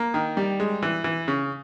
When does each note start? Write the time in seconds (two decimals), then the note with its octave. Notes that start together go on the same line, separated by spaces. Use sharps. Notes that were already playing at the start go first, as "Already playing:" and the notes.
Already playing: A#3
0.14 D#3
0.37 G3
0.60 G#3
0.83 E3
1.04 E3
1.28 C#3